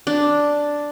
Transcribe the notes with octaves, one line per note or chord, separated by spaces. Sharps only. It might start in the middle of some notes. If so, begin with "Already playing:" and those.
D4